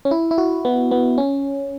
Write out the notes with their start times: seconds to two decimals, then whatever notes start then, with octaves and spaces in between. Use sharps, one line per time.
0.05 C#4
0.11 E4
0.31 E4
0.38 F#4
0.65 B3
0.91 B3
1.18 C#4